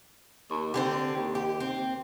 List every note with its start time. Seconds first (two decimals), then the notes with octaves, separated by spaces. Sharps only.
0.50 D#2
0.74 D3 C4 C#4 G4
1.16 D#2
1.35 G4
1.60 C4